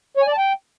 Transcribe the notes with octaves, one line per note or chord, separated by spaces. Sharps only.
C#5
G#5
D5
A5
G5